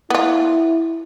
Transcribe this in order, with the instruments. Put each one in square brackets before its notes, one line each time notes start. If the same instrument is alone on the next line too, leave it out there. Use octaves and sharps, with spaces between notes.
[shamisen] B3 F4 [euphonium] E4